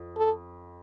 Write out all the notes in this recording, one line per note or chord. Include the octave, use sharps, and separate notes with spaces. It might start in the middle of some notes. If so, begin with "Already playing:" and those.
Already playing: F2 F3
A4